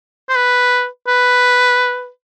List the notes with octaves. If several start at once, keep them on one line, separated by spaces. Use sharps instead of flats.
C5
B4
B4